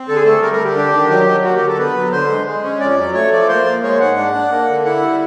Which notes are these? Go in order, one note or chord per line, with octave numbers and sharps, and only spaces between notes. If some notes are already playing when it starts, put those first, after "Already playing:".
Already playing: C4
D3 A4
G#4
A3 A4
G3 A#4
A#4
D3
G4
D4
D#3
F#3
F#3
A#3 F#4
G4
D3
A4
B3 B4
F#3
D3 C5
G#3
G#3
C#4
F2 D5
F#3
A3 C#5
F3 D5
A#3 C5
A#3
G#3 C#5
G#2 F#5
D4
D4
A#3
D3
E4 F#5
G3